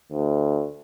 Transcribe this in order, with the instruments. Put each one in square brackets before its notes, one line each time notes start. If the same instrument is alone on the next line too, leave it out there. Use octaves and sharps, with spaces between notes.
[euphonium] D2